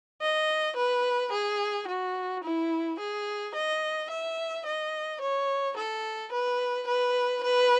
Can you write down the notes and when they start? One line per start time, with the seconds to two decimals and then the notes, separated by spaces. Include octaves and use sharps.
0.22 D#5
0.76 B4
1.32 G#4
1.88 F#4
2.44 E4
3.00 G#4
3.55 D#5
4.10 E5
4.66 D#5
5.21 C#5
5.77 A4
6.32 B4
6.87 B4
7.44 B4